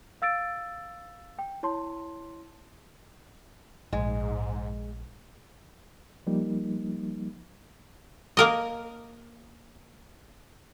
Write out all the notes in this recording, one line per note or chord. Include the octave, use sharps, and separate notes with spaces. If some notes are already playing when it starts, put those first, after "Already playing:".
F5 E6 A6 D7
G5
E4 C#5 A5 C6
A#1 G#2 G#3
F3 G3 A#3 D#4
A#3 A#4 D#5